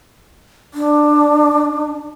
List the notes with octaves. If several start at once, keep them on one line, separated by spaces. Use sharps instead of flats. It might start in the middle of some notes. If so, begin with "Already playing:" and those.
D4